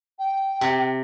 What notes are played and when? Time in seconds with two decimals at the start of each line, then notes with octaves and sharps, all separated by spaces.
0.19 G5
0.61 C3